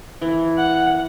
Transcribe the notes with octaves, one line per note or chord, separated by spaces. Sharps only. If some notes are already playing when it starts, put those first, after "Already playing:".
E3
F#5